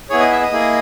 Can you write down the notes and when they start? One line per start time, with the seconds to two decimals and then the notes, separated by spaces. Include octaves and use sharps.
0.10 B3 E4 G#4 C#5
0.20 D#5
0.32 E5
0.41 D#5
0.52 A#3 E4 G#4